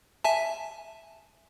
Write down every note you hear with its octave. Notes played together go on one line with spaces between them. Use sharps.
E5 G#5 A5